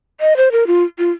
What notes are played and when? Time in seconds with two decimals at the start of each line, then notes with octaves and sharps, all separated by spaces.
0.21 D#5
0.37 C5
0.52 A#4
0.67 F4
0.98 F4